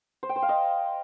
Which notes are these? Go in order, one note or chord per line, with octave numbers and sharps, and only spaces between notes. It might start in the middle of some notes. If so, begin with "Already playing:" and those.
C5
G5
C5
F5
D#5